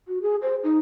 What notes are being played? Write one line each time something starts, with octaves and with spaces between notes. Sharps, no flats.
F#4
G#4
C5
D#4